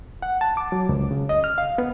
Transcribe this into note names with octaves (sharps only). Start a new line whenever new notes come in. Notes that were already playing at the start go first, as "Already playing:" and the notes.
F#5
A5
D6
F#3
C#2
C#3
D#5
F6
F5
B3